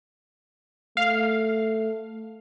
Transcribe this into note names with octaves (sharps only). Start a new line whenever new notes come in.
A3 F5